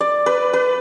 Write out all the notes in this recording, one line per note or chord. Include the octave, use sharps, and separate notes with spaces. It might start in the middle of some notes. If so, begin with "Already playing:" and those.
D5
B4
B4